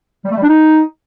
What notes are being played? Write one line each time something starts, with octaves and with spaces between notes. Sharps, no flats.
G3
A3
G3
D4
D#4